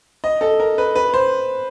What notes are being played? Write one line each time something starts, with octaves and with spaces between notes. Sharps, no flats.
D#5
A4
A#4
B4
B4
C5